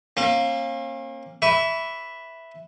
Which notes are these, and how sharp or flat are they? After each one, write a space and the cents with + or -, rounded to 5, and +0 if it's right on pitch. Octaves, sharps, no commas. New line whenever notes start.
A#3 +0 C#4 -45
B4 +0 E5 +0 C#6 +45